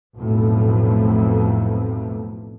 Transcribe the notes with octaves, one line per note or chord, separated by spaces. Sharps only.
B1 F2 A2